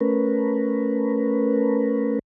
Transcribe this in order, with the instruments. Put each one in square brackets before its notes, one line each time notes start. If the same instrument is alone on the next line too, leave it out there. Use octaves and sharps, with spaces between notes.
[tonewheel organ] A3 C#4 A#4 B4